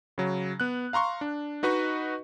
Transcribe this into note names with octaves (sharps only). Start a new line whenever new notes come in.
C#3 F#3
B3 F#6
F5 A#5 C6 C#6
D4
D#4 F#4 B4 D#5 C#6